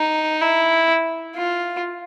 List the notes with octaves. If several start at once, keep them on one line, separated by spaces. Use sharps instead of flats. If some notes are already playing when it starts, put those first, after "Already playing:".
Already playing: D#4
E4
F4